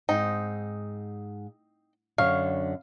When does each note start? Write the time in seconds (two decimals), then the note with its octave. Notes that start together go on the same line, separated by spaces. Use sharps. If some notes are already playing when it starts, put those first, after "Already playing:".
0.09 G#2 C4 D#4
2.18 F#2 D3 C#5 F5